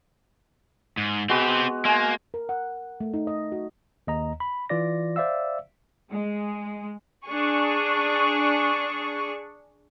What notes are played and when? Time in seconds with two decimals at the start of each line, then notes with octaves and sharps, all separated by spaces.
0.97 G#2
1.29 G#3 B3 C4 F#4 G4
1.85 G#3 A#3 G#5
2.34 A#4
2.49 F#5
3.00 A3
3.14 D#4
3.27 D#5
3.52 F#4
4.07 D#2 D#5 A#5
4.40 B5
4.69 E3 F4 D5 A#6
5.16 C5 D5 E5 F5 E6
6.10 G#3
7.25 D4 G#4 C#6